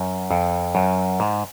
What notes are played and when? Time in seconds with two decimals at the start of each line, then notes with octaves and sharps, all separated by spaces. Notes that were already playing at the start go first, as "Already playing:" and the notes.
Already playing: F#2
0.31 F2
0.75 F#2
1.20 G#2